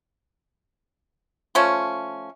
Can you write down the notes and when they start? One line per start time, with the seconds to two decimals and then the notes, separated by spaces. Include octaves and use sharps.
1.55 F3 A3 C#4